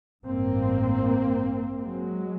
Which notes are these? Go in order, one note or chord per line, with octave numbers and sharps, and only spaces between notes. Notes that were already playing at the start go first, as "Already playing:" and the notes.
A1 G2 A#3 C4
F#3 G#3